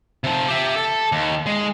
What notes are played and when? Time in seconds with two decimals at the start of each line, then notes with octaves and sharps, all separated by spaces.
0.24 C3 F3
0.48 G4 E5
0.76 A4
1.12 D#2
1.46 G#3